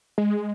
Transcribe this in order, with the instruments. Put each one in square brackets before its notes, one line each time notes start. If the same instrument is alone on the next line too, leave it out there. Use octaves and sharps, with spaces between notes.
[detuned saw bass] G#3